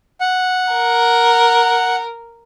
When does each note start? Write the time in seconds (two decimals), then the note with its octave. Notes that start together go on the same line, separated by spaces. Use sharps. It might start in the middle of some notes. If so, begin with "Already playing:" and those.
0.21 F#5
0.72 A#4